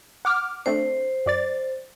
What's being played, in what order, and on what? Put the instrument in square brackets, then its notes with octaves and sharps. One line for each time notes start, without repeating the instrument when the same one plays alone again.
[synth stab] F#5 D6 F6
[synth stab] A3 C4 D4 [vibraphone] C5
[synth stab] F#2 D5 A6